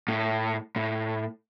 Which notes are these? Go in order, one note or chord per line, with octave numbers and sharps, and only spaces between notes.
A2
A2